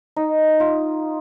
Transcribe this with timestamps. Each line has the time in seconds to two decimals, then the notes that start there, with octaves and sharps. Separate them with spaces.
0.16 D#4
0.60 F4